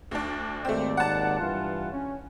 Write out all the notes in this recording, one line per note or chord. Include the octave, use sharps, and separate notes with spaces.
D2 D4
G#1 D#2 A3 C4 D5
F#5 A5
G2 E3 F4
C#4